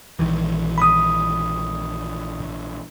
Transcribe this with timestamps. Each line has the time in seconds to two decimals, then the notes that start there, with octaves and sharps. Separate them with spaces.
0.19 A#1 D#3 E3
0.78 B5 D#6